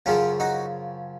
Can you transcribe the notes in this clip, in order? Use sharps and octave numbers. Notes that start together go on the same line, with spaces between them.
F#2 C#3 F3 C#4 F4
D#4 F#4